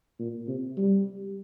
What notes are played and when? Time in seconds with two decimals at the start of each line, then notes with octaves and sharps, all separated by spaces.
0.19 A#2
0.48 C3
0.77 G3